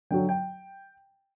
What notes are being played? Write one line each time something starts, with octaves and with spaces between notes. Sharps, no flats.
D3 F#3 G5
G5